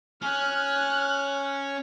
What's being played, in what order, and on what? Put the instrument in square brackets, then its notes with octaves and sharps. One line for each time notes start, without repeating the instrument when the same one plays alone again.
[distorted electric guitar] C#4 [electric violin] F6 F#6